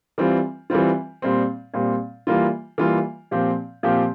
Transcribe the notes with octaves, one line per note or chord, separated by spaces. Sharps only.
E3 G3 C4 F4
E3 G3 C4 F4
A#2 G3 C4
A#2 G3 C4
E3 G3 A#3 F4
E3 G3 A#3 F4
A#2 F3 C4 G4
A#2 F3 C4 G4